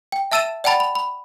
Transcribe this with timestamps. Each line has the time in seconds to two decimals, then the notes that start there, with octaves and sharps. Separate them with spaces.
0.12 G5
0.32 E5 A5 E6 A6 D#7 E7
0.64 D5 F#5 G5 A5 B5 A6
0.80 B5
0.95 B5